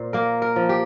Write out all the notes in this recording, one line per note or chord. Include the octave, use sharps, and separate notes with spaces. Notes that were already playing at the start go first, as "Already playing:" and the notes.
Already playing: A#2 C5
A#3 A#4
A#4
F3
G4